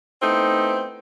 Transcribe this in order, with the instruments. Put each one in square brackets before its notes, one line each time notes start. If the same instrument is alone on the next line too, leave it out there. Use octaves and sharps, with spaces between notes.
[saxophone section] A3 B3 C4 D#4 E4